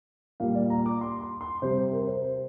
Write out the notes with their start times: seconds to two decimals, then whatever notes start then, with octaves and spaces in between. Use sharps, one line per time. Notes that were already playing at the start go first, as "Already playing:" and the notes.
0.40 A#2 G3 F5
0.55 D5
0.70 A#5
0.86 D6
1.01 C6
1.21 C6
1.41 C6
1.62 C3 G3 C5
1.76 C5
1.92 A#4
2.07 C5